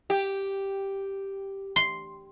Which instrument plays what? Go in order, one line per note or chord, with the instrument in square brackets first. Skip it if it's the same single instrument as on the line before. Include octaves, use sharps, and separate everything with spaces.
[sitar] G4
[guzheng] C6